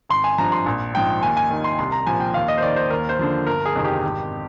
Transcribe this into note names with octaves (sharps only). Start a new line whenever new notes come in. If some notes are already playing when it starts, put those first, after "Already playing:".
G#1 C6
G#5
G2 F3 A#5
C6
A#1
G#2 F3 G5
D#2 G#5
G#5
D#3
C6
C2 C6
A#5
A#2 F3 G#5
G5
D#2 F5
D#5
C5
D#3 D5
C5
D#2 A#4
C5
D3 F3
G1 A#4
G#4
F2 C3 D#3
G4
G#1